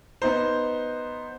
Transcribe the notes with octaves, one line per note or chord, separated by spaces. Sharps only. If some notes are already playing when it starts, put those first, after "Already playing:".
B3 D#4 C5